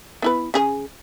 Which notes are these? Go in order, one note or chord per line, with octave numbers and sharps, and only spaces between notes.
B3 E4 B4
C#3 G#4 G#5